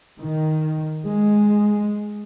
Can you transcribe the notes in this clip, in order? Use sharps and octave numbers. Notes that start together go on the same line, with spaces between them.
D#3
G#3